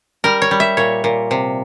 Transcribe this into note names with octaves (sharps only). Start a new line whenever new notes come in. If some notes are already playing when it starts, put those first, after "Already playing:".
G3 A#4
C#5
G3
E5
A#2 C#5
A#2
C3